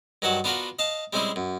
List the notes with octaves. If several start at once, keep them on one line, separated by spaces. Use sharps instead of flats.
G2 D#3 F#3 F#4 F#5 A5
B3 D4 F4 F#4 A#4 B4
D#5 F5 A5
G3 G#3 C4 C#4 E4 G#4
F#2